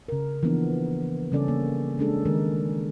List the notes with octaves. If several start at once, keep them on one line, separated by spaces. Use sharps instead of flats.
C#3 A#4
E3 F3 A#3 B3 D4
C#3 G3 C#4 A4 D5
A#3
G#3 C#4 D4 G#4 A4
D#3 G#3 A#4